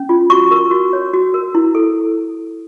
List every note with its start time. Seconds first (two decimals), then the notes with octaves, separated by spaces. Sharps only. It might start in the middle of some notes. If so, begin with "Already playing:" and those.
Already playing: C#4
0.09 F4
0.30 F#4 C#6
0.51 A#4
0.71 F#4
0.93 C#5
1.14 F#4
1.34 A#4
1.55 E4
1.75 A4